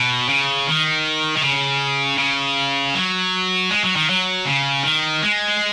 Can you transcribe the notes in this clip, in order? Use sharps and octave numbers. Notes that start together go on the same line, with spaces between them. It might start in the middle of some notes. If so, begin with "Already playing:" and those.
Already playing: B2
C#3
D#3
D#3
C#3
C#3
F#3
G#3
F#3
D#3
F#3
C#3
D#3
G#3